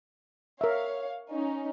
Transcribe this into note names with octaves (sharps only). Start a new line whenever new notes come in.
A#4 C#5 E5 F5
C#4 D#4